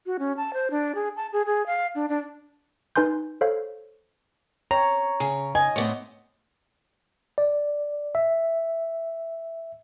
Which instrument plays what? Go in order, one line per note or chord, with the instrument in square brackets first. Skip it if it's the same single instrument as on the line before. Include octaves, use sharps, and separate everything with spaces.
[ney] F#4
C#4
A5
C5
D4
G#4
A5
G#4
G#4
F5
D4
D4
[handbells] D#4 B4 G#5 C6 G6
A4 C5 C#5 F5
[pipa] C4 [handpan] C#5 [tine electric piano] A#5
[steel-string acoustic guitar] C#3 [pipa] G#4
[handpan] D#5 [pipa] G#5
[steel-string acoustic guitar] A2 B3 C4 [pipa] C#5 D5
[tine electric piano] D5
E5